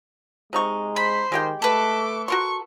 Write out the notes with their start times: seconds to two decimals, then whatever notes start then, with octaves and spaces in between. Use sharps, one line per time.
0.53 C3 G#3 D#4 C#6
0.96 C5 B5
1.32 D#3 G#3 G4 G5
1.62 A3 A4 B4 D6
2.28 F#4 A#4 C6 C#6